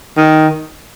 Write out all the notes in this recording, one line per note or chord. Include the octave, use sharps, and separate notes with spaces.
D#3